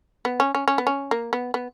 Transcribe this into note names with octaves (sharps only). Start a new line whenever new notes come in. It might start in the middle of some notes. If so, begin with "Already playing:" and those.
B3
C#4
C#4
C#4
B3
C#4
A#3
B3
B3